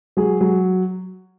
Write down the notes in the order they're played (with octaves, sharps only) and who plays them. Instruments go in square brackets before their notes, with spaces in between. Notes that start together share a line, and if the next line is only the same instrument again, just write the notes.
[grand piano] F#3 G#4
F#3